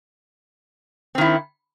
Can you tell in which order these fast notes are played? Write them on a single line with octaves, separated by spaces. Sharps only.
C4 D#3 E4